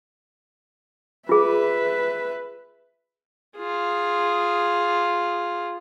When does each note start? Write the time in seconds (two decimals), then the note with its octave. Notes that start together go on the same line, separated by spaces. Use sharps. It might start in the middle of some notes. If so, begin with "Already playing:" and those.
1.29 F4 G#4 B4 E5
3.57 F4 G#4